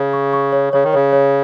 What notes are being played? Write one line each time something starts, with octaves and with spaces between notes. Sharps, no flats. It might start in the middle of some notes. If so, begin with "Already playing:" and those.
Already playing: C#3 C#5
C#6
C#6
C#5
C#3 C#5
D#3
C#3 C#5
C#5